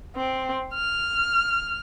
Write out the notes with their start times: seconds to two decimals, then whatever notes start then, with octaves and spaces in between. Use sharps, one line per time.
0.16 C4
0.74 F6